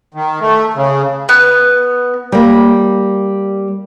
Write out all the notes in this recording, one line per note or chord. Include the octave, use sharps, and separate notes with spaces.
D#3
A3
C#3
B3
G3 A#3